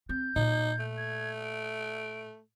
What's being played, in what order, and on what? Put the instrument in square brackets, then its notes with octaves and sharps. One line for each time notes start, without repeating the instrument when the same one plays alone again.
[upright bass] C4 [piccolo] G6
[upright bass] A#2 [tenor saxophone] D#4
[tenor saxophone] A3
[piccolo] G#6
D7